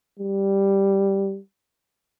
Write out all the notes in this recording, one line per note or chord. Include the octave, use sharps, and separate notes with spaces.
G3